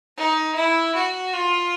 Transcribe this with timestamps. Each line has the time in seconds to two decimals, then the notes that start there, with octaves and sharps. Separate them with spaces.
0.17 D#4
0.55 E4
0.95 F#4
1.33 F4